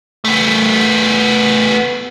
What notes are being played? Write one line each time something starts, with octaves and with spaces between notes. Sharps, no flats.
A3 B3